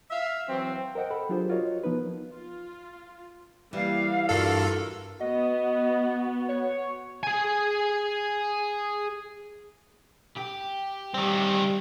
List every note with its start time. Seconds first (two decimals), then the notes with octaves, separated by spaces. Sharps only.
0.10 E5 F5
0.49 E3 F#3 C4
0.95 A#4 C5 D#5 F#5 G5
1.10 A4 B5
1.29 F#3 D4 F4 G4 G#4 C5
1.50 F4 F#4 A#4 C#5 D#5
1.84 F3 B3 D#4 B4
2.32 F4
3.73 E3 G3 A#3 F5
4.29 G2 F4 F#4 A4 A#4
5.20 B3 F#4 D#5
6.49 C#5
7.23 G#4 G#5
10.37 G4
11.14 D#3 G3 C4